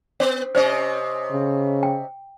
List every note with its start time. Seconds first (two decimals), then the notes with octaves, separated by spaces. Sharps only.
0.20 B3
0.55 C3 C#4 C5 D#5
1.31 C#3
1.83 G5